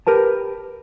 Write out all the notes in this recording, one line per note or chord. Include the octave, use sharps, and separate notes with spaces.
G4 A#4 B4 A5